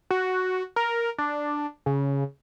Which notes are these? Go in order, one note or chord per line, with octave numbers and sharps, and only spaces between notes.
F#4
A#4
D4
C#3